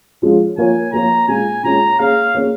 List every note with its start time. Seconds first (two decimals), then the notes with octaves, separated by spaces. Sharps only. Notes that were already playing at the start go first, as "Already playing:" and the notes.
0.22 F3 G#3 C#4 F4
0.57 F3 A#3 F4 A#4 C#5 G#5
0.92 F3 A#3 F4 A#4 C#5 A#5
1.28 A#2 G#3 C#4 F4 G#5
1.63 A#2 G#3 C#4 F4 A#5
1.99 A#3 C#4 G#4 C#5 F5
2.34 A#3 C#4 G#4 C#5